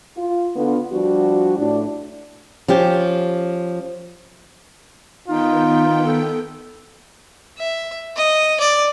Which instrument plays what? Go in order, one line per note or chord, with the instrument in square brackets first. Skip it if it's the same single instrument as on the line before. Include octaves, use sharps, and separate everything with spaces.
[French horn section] F4
D3 B3 F4
F3 G3 D4 F#4
A2 D4
[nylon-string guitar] F3 C#4 G4
[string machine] D#3 B3 G5 [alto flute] D#4 [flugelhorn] F4
[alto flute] A4
[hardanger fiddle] E5
D#5
D5